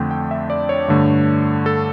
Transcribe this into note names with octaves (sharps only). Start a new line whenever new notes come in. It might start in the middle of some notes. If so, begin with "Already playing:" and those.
Already playing: F2 D3 A3 G5
G5
E5
D5
C#5
G2 D3 A3
A4